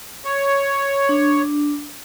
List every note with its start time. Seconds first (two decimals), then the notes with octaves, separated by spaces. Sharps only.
0.25 C#5
1.09 D4